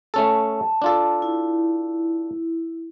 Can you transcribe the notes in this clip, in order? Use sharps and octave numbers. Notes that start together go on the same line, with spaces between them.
A3 C#4 A4 A5
D4 F4 A4
E4